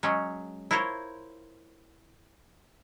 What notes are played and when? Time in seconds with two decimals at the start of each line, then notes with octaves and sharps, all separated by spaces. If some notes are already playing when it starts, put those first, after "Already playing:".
0.03 F#3 G#3 C#4
0.71 E4 F4 A#4 C5 C#5